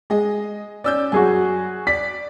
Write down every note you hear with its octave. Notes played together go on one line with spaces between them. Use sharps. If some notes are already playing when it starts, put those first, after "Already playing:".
G#3 G#4 D#5
C#4 D5 E6 G6
F#2 F#4 G#4 G#5
D5 B6